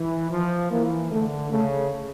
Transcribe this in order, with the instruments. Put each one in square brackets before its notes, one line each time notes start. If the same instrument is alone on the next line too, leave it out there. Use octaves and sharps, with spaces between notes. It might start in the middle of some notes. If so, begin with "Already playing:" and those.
Already playing: [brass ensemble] E3
F3
[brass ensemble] E3 [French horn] A#3
[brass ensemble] D3 [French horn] A3
[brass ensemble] C#3 [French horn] A3